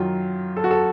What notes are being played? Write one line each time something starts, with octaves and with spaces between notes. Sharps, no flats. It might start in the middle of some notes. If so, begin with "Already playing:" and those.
Already playing: F#2 D#3 F#3 F4
A4
F#4
A4